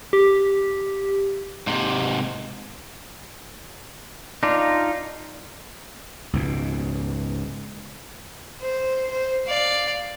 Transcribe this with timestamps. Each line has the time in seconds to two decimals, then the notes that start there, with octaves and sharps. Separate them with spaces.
0.13 G4
1.67 G#2 C3
4.43 D4 D#4 F4
6.33 C#2 G#2 B2
8.61 C5
9.11 C5
9.46 D5 F5